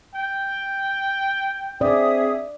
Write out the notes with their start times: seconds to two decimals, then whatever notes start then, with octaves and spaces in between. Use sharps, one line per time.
0.15 G5
1.81 C4 G#4 D5 E5 D#6